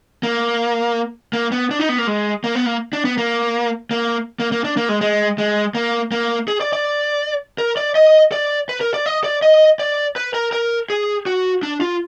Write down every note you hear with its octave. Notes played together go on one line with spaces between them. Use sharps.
A#3
A#3
B3
D4
D#4
B3
A#3
G#3
A#3
B3
A#3
D4
B3
A#3
A#3
A#3
A#3
D4
A#3
G#3
G#3
G#3
A#3
A#3
G#4
D5
D5
A#4
D5
D#5
D5
B4
A#4
D5
D#5
D5
D#5
D5
B4
A#4
A#4
G#4
F#4
D4
F4